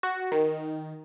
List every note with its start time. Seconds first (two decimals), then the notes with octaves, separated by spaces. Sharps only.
0.03 F#4
0.32 D#3